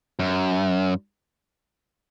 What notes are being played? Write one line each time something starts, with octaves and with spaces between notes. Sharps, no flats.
F#2